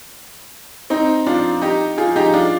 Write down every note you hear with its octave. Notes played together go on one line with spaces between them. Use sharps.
C4 D#4
D4 F4
D#4 G4
F4 G#4
D#4 G4
D4 F4